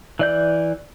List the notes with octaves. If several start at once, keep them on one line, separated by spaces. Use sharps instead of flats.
E3 D5 G6